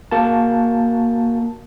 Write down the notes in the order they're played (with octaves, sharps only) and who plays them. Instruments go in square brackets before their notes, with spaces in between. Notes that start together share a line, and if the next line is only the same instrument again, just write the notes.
[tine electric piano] A#3 F#4 A#4 A5